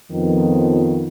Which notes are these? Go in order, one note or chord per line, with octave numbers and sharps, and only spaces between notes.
F2 D#3 F3 B3